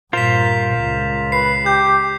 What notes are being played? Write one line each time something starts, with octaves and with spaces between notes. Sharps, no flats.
G2 A#2 F4 A#4 C5 B6 E7 F7
C#2
B4 C7
G4 G6